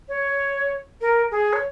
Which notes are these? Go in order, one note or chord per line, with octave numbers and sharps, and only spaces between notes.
C#5
A#4
G#4
C#5